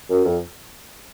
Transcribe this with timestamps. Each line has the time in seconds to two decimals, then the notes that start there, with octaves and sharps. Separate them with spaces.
0.10 F#2
0.25 F2